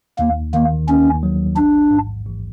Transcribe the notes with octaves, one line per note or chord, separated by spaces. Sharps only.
D#2 A#3
D#3 A#3
D#2 C#4
F#3
A1 D4
G#2
A1